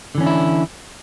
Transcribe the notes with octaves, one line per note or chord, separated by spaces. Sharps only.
D3 E3 C#4 D4 E4